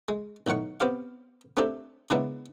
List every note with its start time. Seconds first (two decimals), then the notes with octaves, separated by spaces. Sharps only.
0.08 G#3
0.47 B1 A2 D#3 F#5 C#6
0.80 B3 C4 G4 F5
1.57 A3 A#3 C4 D4 G4 A4
2.10 C#3 G#3 A#3 B3 D4 E4